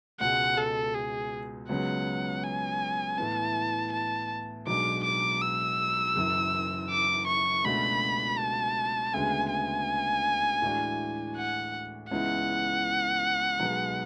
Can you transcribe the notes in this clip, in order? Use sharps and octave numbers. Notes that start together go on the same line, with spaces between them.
C#2 B2 G#3 F#5
A4
G#4
C#2 C#3 F#3 B3 F#5
G#5
A2 E3 B3 A5
A5
B1 B2 G#3 D4 D6
D6
E6
F#1 F#2 E3
D6
C#6
C#2 B2 A3 D4 F#4 B5
A5
D2 C#3 G#3 B3 G#5
G#5
A2 E3 G#3 D4 F#4
F#5
C#2 C#3 E3 B3 E4 F#5
B1 B2 G#3 B3